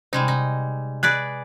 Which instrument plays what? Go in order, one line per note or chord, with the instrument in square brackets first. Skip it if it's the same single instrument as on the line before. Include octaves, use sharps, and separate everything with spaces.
[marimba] C3 [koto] G3 G#3 D#4
[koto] D#4
[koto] G#4 B4 D5 [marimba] F#6